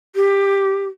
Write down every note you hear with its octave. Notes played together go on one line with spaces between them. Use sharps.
G4